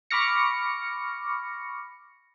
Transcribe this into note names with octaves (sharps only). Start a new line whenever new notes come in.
B5 C#6 D6 F6 A#6 C#7